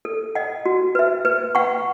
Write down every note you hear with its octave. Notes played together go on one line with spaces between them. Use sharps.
A4
D#5 F#5
F#4
B4 E5
B4
F#5 C#6